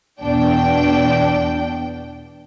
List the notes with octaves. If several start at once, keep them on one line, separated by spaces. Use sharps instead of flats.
E2 B2 D4 G5